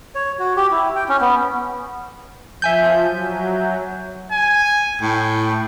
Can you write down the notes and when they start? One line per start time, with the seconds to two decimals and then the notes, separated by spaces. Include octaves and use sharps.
0.15 C#5
0.39 F#4
0.57 G4
0.71 E4
0.96 G5
1.09 C#4
1.21 B3
2.62 F3 E5 G#5 G6
3.08 F#3
4.32 G#5
5.01 A2 G5